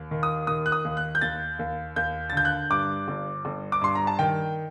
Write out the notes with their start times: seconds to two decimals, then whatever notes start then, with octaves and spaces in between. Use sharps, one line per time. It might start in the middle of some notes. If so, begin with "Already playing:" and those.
Already playing: D#2
0.11 D#3
0.23 D#6
0.47 D#3 D#6
0.66 F#6
0.72 D#6
0.85 D#2
0.97 F#6
1.15 G6
1.21 D#2 A6
1.59 D#2
1.96 D#2 G6
2.30 A6
2.32 D3 G6
2.45 F#6
2.70 G2 D6
3.08 G1
3.45 G1
3.72 D6
3.81 G2 C6
3.95 A#5
4.07 A5
4.19 D#3 G5